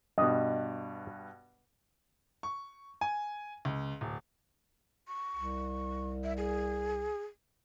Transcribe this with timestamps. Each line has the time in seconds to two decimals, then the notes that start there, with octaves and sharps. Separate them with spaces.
0.18 G2 B2 D#5
2.43 C#6
3.01 G#5
3.65 C#2
4.01 D1
5.08 C#6
5.36 C2
6.24 E5
6.37 G#4